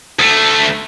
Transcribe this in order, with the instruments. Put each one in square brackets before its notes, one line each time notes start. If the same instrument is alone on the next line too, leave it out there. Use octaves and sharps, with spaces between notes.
[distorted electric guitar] D2 A3